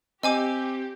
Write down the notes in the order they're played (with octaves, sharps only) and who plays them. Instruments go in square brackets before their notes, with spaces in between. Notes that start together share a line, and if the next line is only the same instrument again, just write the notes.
[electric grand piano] C4 [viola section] G4 [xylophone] D#5 G#5 D6